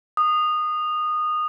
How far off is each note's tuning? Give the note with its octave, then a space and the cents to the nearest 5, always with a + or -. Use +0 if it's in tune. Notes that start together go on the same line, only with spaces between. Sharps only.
D#6 -20